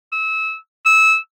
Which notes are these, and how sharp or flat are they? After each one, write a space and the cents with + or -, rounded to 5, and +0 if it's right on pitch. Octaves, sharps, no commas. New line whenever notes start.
E6 -25
E6 -20